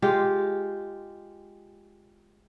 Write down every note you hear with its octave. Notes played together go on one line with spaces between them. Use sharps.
G#3 F4 G4